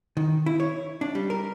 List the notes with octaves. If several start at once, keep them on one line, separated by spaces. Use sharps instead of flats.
D#3
E4
C#5
D4
G3
A#4